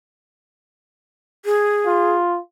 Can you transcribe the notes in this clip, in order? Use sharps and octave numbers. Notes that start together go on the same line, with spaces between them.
G#4
F4